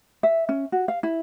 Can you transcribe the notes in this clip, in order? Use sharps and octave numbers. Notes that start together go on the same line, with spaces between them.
E5
C#4
F#4
F5
E4